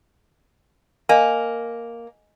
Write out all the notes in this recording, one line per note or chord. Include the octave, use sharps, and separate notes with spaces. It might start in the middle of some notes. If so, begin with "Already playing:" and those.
A#3 D#5 G#5